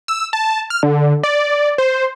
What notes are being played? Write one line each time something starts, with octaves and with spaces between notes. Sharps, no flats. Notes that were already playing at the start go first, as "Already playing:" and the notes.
E6
A5
F6
D3
D5
C5